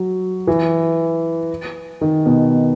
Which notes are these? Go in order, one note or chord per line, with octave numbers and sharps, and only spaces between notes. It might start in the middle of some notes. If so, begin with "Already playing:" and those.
Already playing: F#3
E3
D#3
B2